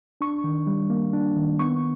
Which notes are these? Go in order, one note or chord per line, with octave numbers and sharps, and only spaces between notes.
D4 C#6
D#3
G3
A#3
D4
D#3
B3 C#6